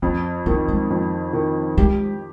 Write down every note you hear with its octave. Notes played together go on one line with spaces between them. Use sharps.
F2 B3
D#3 B3
G#3
F2
D#3
G#3 G4